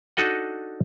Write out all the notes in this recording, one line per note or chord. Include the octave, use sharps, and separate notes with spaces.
D4 D#4 F#4 A4 D#5 F#5